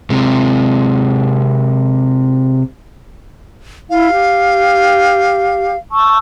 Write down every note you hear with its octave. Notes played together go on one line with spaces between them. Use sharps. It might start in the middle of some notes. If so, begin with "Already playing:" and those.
C3 G#3
E4 F5
G4
A5 C#6 E6